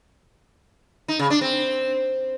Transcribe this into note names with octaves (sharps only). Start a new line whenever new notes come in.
D#4
C#3
D4
C4